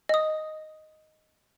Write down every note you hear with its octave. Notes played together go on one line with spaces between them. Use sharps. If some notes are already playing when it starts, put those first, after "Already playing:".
D#5 D#6